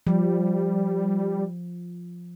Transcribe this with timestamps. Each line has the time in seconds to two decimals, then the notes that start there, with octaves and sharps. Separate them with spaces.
0.07 F3 G3